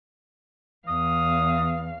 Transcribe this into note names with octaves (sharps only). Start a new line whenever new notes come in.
E2 F5 D#6